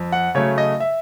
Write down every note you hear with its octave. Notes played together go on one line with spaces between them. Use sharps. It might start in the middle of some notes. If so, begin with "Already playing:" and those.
Already playing: F2
F#5
C#3 F#3 A3 C#5
D#5
E5